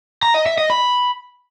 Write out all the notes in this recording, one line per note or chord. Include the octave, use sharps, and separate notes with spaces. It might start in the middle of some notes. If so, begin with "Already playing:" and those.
A#5
D#5
E5
D#5
B5